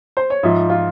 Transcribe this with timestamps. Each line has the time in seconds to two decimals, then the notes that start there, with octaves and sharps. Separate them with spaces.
0.17 C5
0.30 C#5
0.43 G#2 F3 E5
0.70 F4